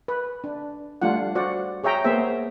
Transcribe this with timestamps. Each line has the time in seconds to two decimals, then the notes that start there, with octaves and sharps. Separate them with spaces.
0.08 B4
0.44 D4
1.02 G3 A3 D4 F4 F#5
1.35 F#4 C5 D5 F#5
1.84 G#4 C#5 E5 G5 A#5
2.04 A#3 B3 G#4 C5 E5 G5